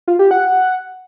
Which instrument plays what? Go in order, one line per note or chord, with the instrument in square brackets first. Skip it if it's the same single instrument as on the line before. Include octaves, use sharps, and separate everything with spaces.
[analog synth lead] F4
G4
F#5